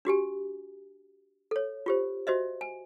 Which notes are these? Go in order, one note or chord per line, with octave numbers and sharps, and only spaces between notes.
D4 F#4 G4 G#5
A4 C#5
F4 G4 C5
F#4 C5 D#5 E5
G#5